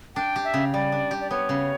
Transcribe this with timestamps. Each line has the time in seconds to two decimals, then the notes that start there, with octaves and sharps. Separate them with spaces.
0.16 D4 G5
0.36 G4
0.44 E5
0.54 C#3
0.73 G3 D5
0.92 D4
1.11 G4
1.21 D5
1.30 B3 C#5
1.49 C#3